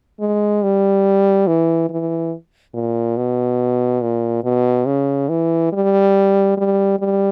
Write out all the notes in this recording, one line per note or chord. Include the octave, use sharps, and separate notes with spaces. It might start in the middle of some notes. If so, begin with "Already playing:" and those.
G#3
G3
E3
E3
A#2
B2
A#2
B2
C#3
E3
G3
G3
G3